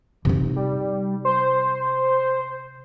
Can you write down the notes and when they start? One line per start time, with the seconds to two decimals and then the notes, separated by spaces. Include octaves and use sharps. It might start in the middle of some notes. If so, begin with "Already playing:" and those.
0.25 C3 D#4
0.56 G3
1.25 C5